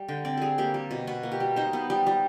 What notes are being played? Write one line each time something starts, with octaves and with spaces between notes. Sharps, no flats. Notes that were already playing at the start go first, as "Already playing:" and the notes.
Already playing: G3
D3 G5
C4 D5
G3 G#4 A4
A#3 G4
G3
B2
B2 F#4
A#3
G4
G3
D#4 C5
B3
G3
G3